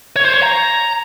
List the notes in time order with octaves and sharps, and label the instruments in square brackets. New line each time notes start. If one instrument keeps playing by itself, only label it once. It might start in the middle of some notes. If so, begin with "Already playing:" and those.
[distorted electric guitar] C#5
C5
C#5
A#5